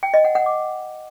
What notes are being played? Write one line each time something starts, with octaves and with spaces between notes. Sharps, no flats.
G5
D#5
F#5
F#5
D6